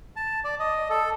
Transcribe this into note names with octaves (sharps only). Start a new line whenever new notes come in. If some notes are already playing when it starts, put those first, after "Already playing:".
A5
D5
D#5
A4